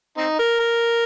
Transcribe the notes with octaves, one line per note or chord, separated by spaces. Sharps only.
C4 D#4
A#4
A#4